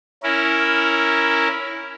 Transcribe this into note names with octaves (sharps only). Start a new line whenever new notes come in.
C#4 E4 A#4